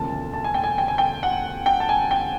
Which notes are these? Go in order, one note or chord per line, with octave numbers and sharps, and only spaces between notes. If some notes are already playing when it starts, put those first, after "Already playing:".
Already playing: E1 D2 C#3 F3 A#3 A5
A5
G#5
G5
G#5
G5
G#5
G5
F#5
G5
A5
G#5
G5